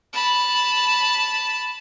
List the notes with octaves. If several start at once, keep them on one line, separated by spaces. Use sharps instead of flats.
A5 B5